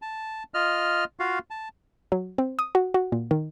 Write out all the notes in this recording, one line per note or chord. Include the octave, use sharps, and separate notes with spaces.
A5
F4 D#5 F6
F4 F#4 F5
A5
F#3
C4
D#6
F#4
F#4
A#2
D#3